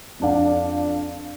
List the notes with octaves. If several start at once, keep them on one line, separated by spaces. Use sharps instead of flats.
F2 D4 F5